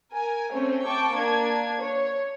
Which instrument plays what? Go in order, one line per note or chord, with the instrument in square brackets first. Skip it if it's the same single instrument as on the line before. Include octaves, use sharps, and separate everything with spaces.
[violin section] A#4 G#5
A3 C4 C#4 C#5
G5 A5 C#6 D6
A#3 D4 G#6
C#5